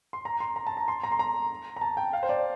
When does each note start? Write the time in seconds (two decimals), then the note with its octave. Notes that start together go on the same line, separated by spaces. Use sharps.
0.13 C6
0.25 A#5
0.40 C6
0.56 A#5
0.67 A5
0.77 A#5
0.88 C6
1.04 A#5
1.12 C6
1.19 A#5
1.76 A#5
1.81 A5
1.97 G5
2.13 F5
2.23 C5
2.29 D5